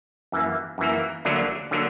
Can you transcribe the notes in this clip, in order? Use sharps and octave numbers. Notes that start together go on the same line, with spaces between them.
F#2 E3 A#3
F#2 E3 A#3
D2 D3 F#3 A#3 D4
D3 F#3 A#3 D4